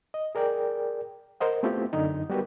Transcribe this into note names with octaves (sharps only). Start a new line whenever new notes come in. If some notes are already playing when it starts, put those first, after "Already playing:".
D#5
G#4 A#4 D5 G5
A#4 C5 D#5 F#5
A3 B3 C4 E4 F4 G4
F#2 D3 D#4
G3 B3 F#4 G4 A#4 B4